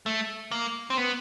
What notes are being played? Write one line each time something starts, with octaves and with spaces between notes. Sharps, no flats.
A3
A#3
C4
B3